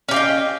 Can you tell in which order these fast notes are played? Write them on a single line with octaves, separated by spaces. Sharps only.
C#4 G4 F5 D#5